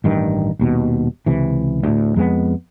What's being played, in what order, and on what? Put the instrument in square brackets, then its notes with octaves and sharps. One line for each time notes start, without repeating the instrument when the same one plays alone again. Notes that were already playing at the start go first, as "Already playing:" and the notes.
[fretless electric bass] A1 G2 D#3
D#1 D#2 B2
C#2 C3 E3
D2 A2
F2 G#3 A3 B3